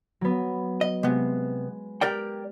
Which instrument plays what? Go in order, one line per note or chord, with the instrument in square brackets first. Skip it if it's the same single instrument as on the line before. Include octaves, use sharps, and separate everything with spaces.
[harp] F#3 B3
[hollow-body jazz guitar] D#5
[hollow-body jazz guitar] C3 B3 [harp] G#3
[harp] G4 [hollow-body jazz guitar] A#4 D5 G5